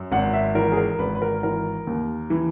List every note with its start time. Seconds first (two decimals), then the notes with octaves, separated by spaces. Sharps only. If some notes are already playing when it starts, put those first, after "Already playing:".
Already playing: F#2
0.11 G#1 F#5
0.33 E5
0.55 E3 A#4
0.72 G#4
0.77 A#4
0.99 G#1 B4
1.15 B4
1.22 A#4
1.43 E3 A#4
1.87 D#2
2.30 E3